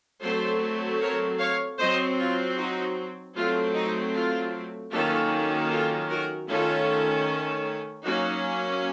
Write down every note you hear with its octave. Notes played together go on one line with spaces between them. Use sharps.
F#3 A3 C4 A4 C5
A#4 C#5
C#5 F5
F#3 C4 C5 D#5
F4
D#4 F#4
F#3 A3 C4 F4
D#4
F4
D#3 F#3 A#3 C#4 F4 A4
F4 A4
F#4 A#4
D#3 A3 C#4 F4 A4
F#3 A#3 C#4 D#4 F#4